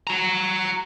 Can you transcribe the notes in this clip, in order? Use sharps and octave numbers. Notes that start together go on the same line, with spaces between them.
F#4 A#5